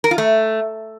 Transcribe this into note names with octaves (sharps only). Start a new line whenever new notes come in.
A#4
F4
A3